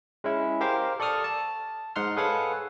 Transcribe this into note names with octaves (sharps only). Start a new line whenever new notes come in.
G#3 C#4 E4
G4 A#4 C5 F5
A4 D5 C#6 D#6 F6
A5
G#2 D#4 F#5 C6 F6
G#4 A4 B4 C#5 F5 F#5